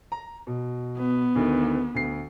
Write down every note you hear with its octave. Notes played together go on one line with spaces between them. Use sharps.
A#5
B2
B3
D2 D#3
D2 C7